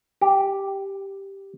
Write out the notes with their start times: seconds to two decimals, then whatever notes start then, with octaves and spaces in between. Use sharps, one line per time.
0.21 G4